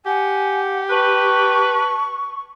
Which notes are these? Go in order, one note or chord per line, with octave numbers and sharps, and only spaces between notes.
G4 F#5 G#5
B4 A5 C#6